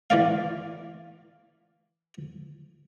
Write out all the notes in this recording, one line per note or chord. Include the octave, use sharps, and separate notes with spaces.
E3 A#3 D5 F5